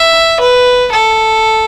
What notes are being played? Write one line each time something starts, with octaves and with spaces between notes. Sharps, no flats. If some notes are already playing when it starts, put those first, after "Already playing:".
Already playing: E5
B4
A4